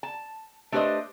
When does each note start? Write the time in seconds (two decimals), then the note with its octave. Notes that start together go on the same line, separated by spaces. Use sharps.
0.03 A5
0.72 A3 D4 G4 B4 C5 D#5